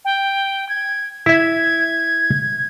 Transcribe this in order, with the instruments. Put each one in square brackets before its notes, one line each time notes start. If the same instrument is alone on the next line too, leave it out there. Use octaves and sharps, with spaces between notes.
[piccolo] G5
G#6
[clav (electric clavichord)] E4 E5 [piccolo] G#6